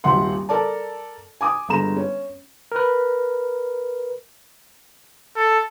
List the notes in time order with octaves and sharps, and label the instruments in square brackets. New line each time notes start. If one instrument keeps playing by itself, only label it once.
[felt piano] D#1 G#1 E5 F#5 C6
A4 A#4 D5 A5
G#5 D6 D#6
G1 D3 G#3 A#5 E7
C#4
[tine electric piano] A#4 B4
[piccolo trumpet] A4